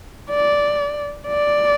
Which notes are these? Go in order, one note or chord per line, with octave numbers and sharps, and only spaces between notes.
D5
D5